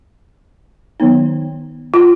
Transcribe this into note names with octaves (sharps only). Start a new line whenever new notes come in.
D#3 F#3 B3 D#4
F4